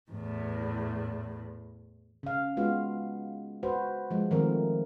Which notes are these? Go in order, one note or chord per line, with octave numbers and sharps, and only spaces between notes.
E2 A2
C#3 F5
G#3 B3 F4 F#4 F5
F#4 B4 C5
F3 G#3
D#3 F3 A3 C4 A#4